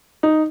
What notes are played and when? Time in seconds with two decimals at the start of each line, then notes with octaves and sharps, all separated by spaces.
0.23 D#4